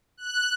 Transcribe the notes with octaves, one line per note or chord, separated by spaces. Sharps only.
F#6